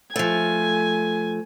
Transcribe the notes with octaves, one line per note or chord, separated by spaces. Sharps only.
F3 A3 G#5